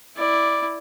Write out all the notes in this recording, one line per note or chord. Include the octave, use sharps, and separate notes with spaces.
E4 D5